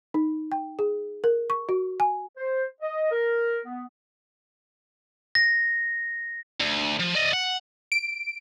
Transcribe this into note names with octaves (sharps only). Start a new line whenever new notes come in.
D#4
G5
G#4
A#4
C#6
F#4
G#5
C5
D#5
A#4
B3
A#6
D2
F3
D5 D#5
F#5
D7